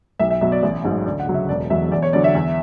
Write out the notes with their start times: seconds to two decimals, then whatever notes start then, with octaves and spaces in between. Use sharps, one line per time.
0.20 B1 E5
0.30 E5
0.41 B2 F#3 E5
0.52 D5
0.63 A1
0.84 G#2 F#3
1.06 D2 D5
1.20 F#5
1.27 C#3 F#3
1.34 E5
1.49 E1 D5
1.70 E2 B2 F#3 E5
1.92 E2 D5
2.02 C#5
2.13 D3 F#3 D5
2.24 E5
2.35 E2